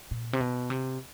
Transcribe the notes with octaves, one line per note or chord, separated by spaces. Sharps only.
A#2
C3
B2
C3